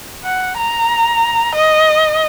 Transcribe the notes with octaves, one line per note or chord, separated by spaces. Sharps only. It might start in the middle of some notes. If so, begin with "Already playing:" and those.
F#5
A#5
D#5